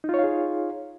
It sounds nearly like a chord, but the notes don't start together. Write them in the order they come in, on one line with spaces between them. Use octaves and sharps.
D#4 F4 C#5 F5 G#4